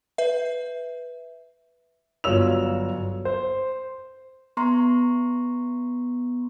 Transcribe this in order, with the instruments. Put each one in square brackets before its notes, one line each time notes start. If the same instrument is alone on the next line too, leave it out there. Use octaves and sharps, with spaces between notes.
[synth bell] B4 E5
[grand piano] G1 F#3 F4 C#5 E6 F7
C5
[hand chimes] B3 A#5 C6 C#6